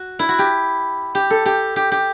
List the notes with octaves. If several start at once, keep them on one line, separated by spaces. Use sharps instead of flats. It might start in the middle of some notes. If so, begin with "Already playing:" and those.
Already playing: F#4
E4
F#4
G4
G4
A4
G4
G4
G4